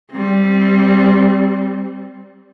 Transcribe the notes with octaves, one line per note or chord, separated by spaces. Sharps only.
G3 C4